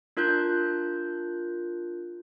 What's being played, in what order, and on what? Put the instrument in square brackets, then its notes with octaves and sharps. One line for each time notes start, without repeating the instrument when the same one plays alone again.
[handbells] D4 F4 A#4 F#6 G6